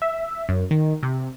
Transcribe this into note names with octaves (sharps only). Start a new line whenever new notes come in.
E5
F#2
D#3
C3